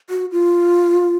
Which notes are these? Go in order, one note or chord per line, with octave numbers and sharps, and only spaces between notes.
F#4
F4